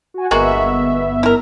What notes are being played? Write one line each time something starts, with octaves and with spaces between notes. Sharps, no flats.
F#4 G#5
G1 G#3 A#3 B3 F#4 E5
E4 A#4